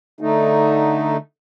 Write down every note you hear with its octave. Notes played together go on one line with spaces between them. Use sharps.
D3 A3 D#4